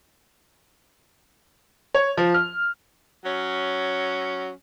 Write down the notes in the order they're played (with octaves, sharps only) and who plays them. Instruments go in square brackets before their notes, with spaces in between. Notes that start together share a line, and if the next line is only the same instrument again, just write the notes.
[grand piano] C#5
F3
F6
[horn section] F#3 C#4